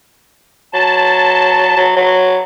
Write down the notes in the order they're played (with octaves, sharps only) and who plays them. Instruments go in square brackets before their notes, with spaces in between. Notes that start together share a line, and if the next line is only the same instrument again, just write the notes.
[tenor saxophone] F#3 [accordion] A5
[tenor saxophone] F#3
F#3